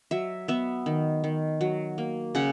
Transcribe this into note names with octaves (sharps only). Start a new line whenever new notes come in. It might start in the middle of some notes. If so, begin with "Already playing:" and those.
F#3 E5
B3 E5
D#3
D#3
F#3
A#3
C#3 F#5